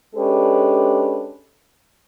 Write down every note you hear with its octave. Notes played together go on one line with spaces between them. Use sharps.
G#3 C#4 D4 G4 A4 B4